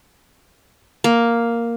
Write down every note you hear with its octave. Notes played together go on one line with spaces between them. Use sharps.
A#3